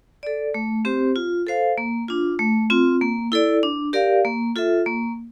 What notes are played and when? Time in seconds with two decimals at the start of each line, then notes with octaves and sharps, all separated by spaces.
0.23 A4 D5
0.54 A3
0.85 C4 G4 C5
1.16 F4
1.47 A4 C5 F5
1.78 A#3
2.08 D4 F4
2.39 A3
2.70 C4 F4
3.01 A#3
3.32 E4 A4 D5
3.63 D4
3.93 G4 A#4 D5 F5
4.25 A#3
4.56 F4 A4 E5
4.86 A#3